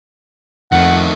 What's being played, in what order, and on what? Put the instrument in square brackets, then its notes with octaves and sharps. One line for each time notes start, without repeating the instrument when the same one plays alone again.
[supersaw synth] F2 [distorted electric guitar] D#3 A3 [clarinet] F#5